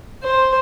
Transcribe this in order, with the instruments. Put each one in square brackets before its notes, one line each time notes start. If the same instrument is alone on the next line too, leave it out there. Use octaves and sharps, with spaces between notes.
[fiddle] C5